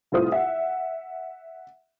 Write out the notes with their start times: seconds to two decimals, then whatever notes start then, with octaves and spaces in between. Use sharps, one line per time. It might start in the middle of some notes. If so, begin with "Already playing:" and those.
0.12 C2 A2 F4 C5 D#6
0.32 E5 F#5